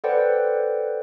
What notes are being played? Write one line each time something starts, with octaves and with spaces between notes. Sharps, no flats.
A4 B4 C5 D5 F#5 G5